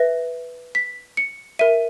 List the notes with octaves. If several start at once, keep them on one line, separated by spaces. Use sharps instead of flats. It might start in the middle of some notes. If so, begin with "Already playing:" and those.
Already playing: B4 E5 A#6
B6
C#7
A#4 E5 D#7